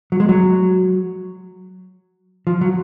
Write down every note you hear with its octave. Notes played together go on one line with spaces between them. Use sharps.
F#3
G#3
F#3
F3
F#3